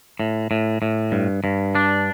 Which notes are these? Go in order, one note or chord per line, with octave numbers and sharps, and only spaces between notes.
A2
A2
A2
G2
G2
D4